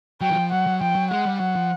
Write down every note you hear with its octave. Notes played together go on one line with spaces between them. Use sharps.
F#3 G5
E3
F3
F#3 F#5
F#3
F3 G5
F#3
G#3 F#5
G3
F#3 F#5
F3